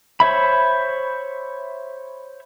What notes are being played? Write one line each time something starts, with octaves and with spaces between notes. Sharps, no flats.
C5 C#5 E5 B5